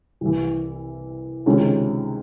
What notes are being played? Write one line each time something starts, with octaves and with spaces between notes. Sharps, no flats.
C2 C3 E3
C#2 C3 D#3 G#3 C#4